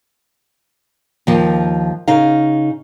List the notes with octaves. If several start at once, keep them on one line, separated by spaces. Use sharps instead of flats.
D#2 F3
C#3 D#4 F5